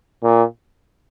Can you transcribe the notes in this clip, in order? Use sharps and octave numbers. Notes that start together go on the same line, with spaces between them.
A#2